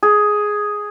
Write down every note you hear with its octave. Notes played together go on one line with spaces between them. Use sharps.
G#4